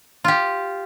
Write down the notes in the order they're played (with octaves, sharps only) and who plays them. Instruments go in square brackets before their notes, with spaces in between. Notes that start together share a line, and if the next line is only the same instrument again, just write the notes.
[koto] F4 G4